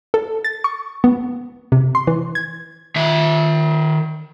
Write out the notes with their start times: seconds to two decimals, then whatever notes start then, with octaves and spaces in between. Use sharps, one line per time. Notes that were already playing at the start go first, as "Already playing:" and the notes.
0.14 A4
0.45 A6
0.64 C#6
1.04 B3
1.72 C3
1.95 C6
2.07 E3
2.35 G#6
2.96 D#3 E5